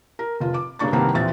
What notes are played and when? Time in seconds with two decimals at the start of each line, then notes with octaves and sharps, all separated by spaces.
0.19 A#4
0.40 F1 F4
0.54 D6
0.79 G2 C#3 A#3 D4 C#6 A6
0.92 C2 G2 D#3 A#3 C4 F#5
1.14 A#1 D#2 E3 C4 E5 A6